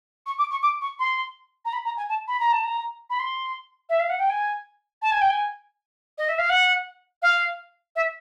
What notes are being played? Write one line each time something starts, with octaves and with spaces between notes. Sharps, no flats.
C#6
D6
C#6
D6
C#6
C6
A#5
B5
A#5
G#5
A5
B5
A#5
A5
A#5
B5
C6
E5
F5
F#5
G5
G#5
A5
G#5
G5
G#5
D#5
E5
F5
F#5
F5
E5